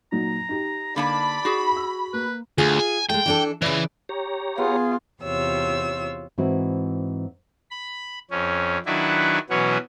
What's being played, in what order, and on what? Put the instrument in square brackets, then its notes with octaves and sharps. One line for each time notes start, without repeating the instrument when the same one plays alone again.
[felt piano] A#2 F#3 D#4 [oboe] A#5
[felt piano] D#4 G4
[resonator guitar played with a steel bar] D3 A#3 A5 [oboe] D5 [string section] B5
[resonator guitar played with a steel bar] F#4 G#4
[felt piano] E6
[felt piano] A#3 [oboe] B4
[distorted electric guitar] D2 [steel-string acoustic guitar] F4 G#4
[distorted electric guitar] G#5
[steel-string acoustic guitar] G#3 A3 [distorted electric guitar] G5
[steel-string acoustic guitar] E3 D4 A4
[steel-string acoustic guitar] C#3 D5 [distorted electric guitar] E3
[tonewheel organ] G4 C#5 A#5
[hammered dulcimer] B3 [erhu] F4 [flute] G#4
[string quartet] E2 C3 F4 G4 C#5 E6
[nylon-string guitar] G#2 E3 C4 E4 F#4
[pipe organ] B5
F2 C#4
D#3 F#3 D4 E4 F#4 B4
B2 E3 F#3 B3 C#4 F#4